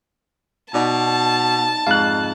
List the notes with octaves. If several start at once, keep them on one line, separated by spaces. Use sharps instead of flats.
B2 D#4 D5 A5
F2 G#2 F5 F#6